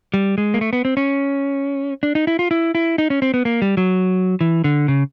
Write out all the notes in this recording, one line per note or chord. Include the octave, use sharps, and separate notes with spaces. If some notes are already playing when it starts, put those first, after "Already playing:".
G3
G#3
A#3
A3
B3
C4
C#4
D4
D#4
E4
F4
E4
E4
D#4
C#4
C4
B3
A#3
G3
F#3
E3
D3
C#3